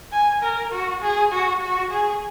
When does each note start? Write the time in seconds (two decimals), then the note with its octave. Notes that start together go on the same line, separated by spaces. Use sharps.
0.12 G#5
0.42 A#4
0.72 F#4
1.02 G#4
1.32 F#4
1.61 F#4
1.91 G#4